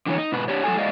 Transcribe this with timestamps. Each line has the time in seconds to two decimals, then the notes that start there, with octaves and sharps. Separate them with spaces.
0.06 D3 E3 C#5
0.18 D#4
0.32 G#2 B2 B4
0.48 D4 G4 C#5
0.64 F#3 F#4 A4 G#5
0.77 G#3 G#4 D5 D#5 F5